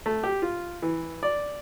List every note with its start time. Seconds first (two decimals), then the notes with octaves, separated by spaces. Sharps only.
0.06 A3
0.24 G4
0.42 F4
0.82 E3
1.23 D5